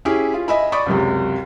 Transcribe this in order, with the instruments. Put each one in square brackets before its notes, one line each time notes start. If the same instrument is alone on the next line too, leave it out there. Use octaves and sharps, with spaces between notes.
[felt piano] C#4 E4 G4 G#4
F4
D#5 E5 G#5 B5
D5 B5 C#6 D#6
C#2 F#2 C3